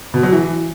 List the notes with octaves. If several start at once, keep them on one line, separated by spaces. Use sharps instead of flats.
B2
F#3
E3